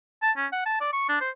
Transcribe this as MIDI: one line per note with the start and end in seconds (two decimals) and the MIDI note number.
0.23 0.31 81
0.37 0.46 61
0.52 0.63 78
0.66 0.77 81
0.81 0.91 74
0.93 1.06 85
1.09 1.16 62
1.21 1.30 72